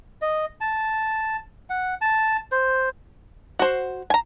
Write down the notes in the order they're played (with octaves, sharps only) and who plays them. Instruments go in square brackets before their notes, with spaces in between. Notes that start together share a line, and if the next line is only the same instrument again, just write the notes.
[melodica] D#5
A5
F#5
A5
C5
[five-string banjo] F#4 C5
G#5 A#5